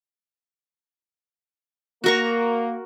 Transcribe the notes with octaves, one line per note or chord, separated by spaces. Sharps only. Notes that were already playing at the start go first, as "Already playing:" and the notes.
A#3 F#4 A#4 C#6